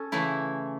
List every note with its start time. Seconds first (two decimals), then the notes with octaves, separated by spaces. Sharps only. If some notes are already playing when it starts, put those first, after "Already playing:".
Already playing: C#4 A4
0.12 C#3 E3 A3 E4